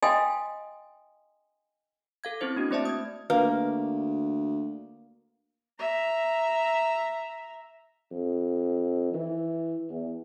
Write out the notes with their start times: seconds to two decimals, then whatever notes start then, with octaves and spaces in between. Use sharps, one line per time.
0.03 D#5 F5 G5 G#5 C6 D#6
2.24 A4 F5 G#6
2.41 C4 C#4 E4 C5
2.56 A#3 D4 F#4
2.71 A3 C4 C5 D5 E5 A5
2.85 D#6 G#6
3.30 D2 A#3 B4
5.79 E5 A#5
8.11 F2
9.14 E3
9.90 E2